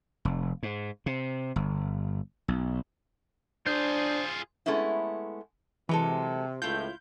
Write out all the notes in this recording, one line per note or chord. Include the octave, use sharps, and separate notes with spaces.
F1
G#2
C3
G1
B1
D4 F4 G#4 C5
G#3 A3 B3 C#4 E4
C3 E3 F#3 G#3 A4
C#2 A2 E4 F4 G6